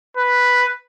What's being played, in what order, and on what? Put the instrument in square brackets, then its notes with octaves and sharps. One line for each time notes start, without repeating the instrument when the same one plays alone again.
[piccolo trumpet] B4